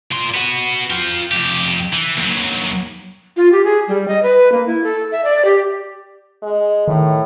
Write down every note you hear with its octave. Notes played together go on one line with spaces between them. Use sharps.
A#2 C6
B3 F#4
F4 G5
F2 G4
E3
D#2 F#3
F4
G4
G#4
G3
D#5
B4
A#3
E4
A4
E5
D5
G4
G#3
A2 D#3